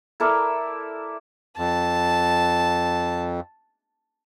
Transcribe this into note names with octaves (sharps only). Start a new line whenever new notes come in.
E4 A4 A#4 D5
F2 A5